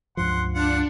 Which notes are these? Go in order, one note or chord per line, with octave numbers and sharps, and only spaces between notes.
C#2 G2 F3 F#5 C6
D4 F4 F#5